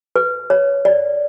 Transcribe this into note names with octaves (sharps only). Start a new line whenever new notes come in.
B4
C#5
D5